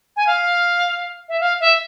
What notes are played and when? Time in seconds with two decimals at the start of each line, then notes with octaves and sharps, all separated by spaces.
0.17 G#5
0.27 F5
1.29 E5
1.40 F5
1.60 E5